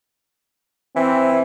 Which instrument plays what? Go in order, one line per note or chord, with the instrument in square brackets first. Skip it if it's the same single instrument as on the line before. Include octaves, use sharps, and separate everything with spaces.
[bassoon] E3 [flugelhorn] C4